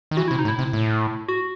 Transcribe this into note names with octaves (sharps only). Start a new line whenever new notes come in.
D#3
E3 F#4
C3 E4
D#4
A2
E4
C3
A2
F#4